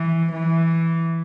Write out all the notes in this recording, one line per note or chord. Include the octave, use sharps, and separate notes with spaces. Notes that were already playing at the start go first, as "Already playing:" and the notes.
Already playing: E3
E3